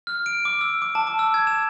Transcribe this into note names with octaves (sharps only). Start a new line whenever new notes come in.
F6
D7
D6
E6
D6
A5
D6
E6
G#6
E7